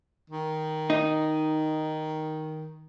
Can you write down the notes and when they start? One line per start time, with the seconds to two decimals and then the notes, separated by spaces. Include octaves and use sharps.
0.30 D#3
0.90 D#4